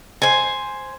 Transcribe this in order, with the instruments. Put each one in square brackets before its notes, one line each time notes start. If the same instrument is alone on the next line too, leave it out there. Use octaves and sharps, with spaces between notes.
[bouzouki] C5 G#5